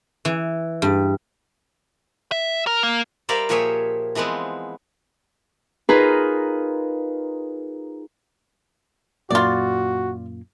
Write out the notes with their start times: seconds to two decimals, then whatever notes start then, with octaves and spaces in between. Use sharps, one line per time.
0.25 E3
0.82 G2
2.32 E5
2.67 A#4
2.83 A#3
3.29 G3 A#4 C5 D5 E5 F5
3.49 A#2 F3 G4 G#4 C#5 E5
4.15 E3 F3 G#3 B3 C4
5.89 D#4 F4 G#4 A#4 B4
9.30 F#2 A#2 A#3 F4 F#4 D5